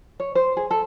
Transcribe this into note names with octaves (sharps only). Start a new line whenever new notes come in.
C#5
C5
G#4
A4